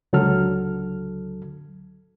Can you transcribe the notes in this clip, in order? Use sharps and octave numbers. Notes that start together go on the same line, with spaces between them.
C#2 D3 F#3 A4 F6